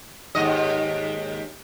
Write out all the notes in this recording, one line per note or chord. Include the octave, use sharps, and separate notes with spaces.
D#2 G#2 D#5